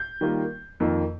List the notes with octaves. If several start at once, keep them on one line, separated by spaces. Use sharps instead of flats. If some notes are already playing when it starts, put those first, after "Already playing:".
Already playing: G6
D#3 G3 A#3 F4
F2 D#3 A#3 F4